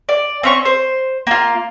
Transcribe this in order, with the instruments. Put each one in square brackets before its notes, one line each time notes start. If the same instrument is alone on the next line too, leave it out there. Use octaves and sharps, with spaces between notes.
[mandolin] D5
C4 C#4 C#6
C5
A#3 F4